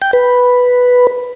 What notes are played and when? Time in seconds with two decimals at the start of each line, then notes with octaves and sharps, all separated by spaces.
0.02 G5
0.13 B4